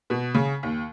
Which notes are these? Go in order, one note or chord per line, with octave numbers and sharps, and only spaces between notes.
B2
C#3
D#2